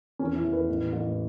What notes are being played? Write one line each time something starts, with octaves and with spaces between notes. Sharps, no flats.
E2 C#4
E4
E2
B4
A1
A1